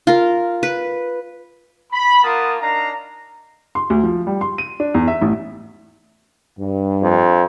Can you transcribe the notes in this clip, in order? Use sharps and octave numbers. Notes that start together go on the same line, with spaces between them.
F4 A#4
B4
B5
A#3 F4 A#4 F#5 A5 D#6
D4 D#4 F5 A#5
C6
D2
F3
G3
C6
D#7
D4
E2
E5
A1
G2
F2